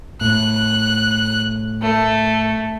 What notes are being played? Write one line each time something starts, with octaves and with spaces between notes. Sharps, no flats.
A2 F#6
A3